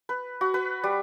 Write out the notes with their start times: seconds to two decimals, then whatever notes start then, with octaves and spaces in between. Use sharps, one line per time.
0.09 B4
0.41 F#4
0.54 B4
0.84 G3